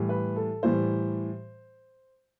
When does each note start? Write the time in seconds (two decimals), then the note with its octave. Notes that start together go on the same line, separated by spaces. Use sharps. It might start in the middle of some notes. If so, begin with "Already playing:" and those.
Already playing: A2 E3 G3
0.09 B4
0.36 A4
0.63 A2 E3 G3 C5